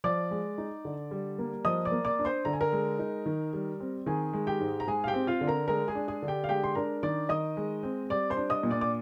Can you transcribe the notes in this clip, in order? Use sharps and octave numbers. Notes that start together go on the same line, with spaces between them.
F3 D5 D6
G#3
D#4
D3
G3
A#3
F3 D#5 D#6
D5 D6
A#3
D5 D6
D4
C5 C6
D3 A#5
G#5
A#4 A#5
G#3
D#4
D#3
G3
C4
D#3 G#4 G#5
G#3
G4 G5
G#2
A#5
G#3 G#4 G#5
F5
G4 G5
C4
F4 F5
D3
A#4 A#5
G#3 A#4 A#5
G#4 G#5
D4
G#4 G#5
D3
G4 G5
F5
G#3 G4 G5
C6
D4 A#4 A#5
D#3 D5 D6
D#3 D#5 D#6
G#3
C4
G3 D5 D6
C5 C6
D4
D#5 D#6
A#2
D5 D6
D6